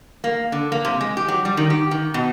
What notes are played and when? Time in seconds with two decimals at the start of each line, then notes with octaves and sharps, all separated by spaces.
0.24 A#3
0.52 D3
0.72 A#3
0.85 C3
1.01 G#3
1.17 G4
1.28 F#3
1.45 G3
1.57 D#3
1.70 G4
1.91 D#3
2.14 B2